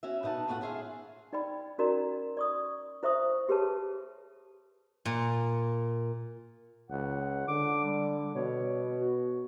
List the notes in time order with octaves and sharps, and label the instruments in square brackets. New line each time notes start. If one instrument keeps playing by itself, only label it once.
[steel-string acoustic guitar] C#4 F#4 E5
B2 B3 D#4 F#5 A5
E2 A2 A3 F4 F#5
C#4 F4 G#4 E5 F5
[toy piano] D#4 D5 G5 B5
C#4 D#4 F#4 A#4 D5 A#5
D5 C#6 D#6
E4 C5 E5 C#6 D#6
G4 G#4 B4 C#5 A5
[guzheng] A#2
[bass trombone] C#2 [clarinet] F#5
[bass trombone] D3 [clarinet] D6
[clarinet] G3
[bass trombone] B2 [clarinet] C#5
[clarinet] F#4